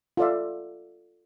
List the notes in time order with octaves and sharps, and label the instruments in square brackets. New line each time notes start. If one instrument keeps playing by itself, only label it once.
[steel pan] F4 A4 D5 E5